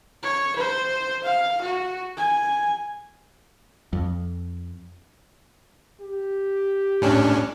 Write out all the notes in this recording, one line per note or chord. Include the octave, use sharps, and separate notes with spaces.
C#5
C5
F5
F#4
G#5
F2
G4
A2 C#4 D4